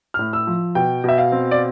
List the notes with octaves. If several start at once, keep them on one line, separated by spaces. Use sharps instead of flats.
A2 F6
E6
F3
B2 G5
B2 E5
F5
C4
D5